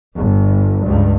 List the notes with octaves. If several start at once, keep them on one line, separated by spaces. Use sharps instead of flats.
G1
C#2 G2